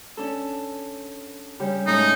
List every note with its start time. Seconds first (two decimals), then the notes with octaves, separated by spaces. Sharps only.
0.17 C#4 D4 A4
1.60 C#3 G3 G4
1.87 A2 G#3 C#4 D#4